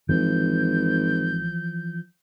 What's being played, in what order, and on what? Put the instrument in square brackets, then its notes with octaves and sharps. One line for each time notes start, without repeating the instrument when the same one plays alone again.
[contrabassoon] G#1 [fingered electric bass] E3 F3 [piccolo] G6